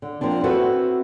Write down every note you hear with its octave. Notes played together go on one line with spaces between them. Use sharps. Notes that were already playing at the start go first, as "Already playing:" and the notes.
D3
F3 A#3 C4 D4
C4 E4 F#4 A4 B4